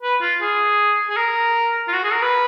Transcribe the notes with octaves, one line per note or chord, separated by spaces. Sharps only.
B4
F4
G#4
G#4
A#4
F4
F#4
G#4
A#4
B4